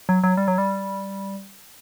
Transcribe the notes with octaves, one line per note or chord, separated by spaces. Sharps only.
F#3
F#3
G3
F#3
G3